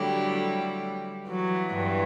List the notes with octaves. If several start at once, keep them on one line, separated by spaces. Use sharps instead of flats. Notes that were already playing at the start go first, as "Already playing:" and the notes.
Already playing: D3 F#3 G3 A3 E4 G4
E3 F#3 B3 F#4
G2